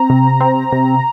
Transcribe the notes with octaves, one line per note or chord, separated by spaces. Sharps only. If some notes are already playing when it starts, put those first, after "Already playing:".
Already playing: C4 A#5
C3
C4
C3